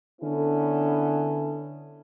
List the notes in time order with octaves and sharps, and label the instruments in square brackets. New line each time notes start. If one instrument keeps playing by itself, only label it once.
[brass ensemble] D3 B3 C#4 E4 A4